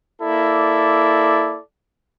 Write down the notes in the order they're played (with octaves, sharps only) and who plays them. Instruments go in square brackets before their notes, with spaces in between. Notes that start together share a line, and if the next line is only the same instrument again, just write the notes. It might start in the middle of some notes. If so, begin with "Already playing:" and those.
[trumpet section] A#3 E4 A4 D5